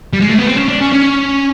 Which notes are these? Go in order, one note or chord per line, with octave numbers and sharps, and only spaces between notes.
G3
G#3
A3
B3
C4
C#4
D4
C#4
C#4